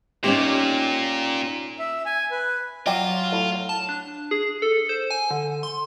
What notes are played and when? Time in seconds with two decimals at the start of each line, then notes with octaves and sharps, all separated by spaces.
0.24 A#2 C#4 D#4 G4
1.79 E5
2.06 G#5
2.31 B4
2.86 F#3 F4 D5 G5
3.32 A2
3.69 A5
3.89 D4
4.31 G#4
4.62 A4
4.89 C5
5.10 G#5
5.31 D3
5.63 C6